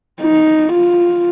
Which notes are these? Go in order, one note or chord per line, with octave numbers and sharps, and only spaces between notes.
D#4
F4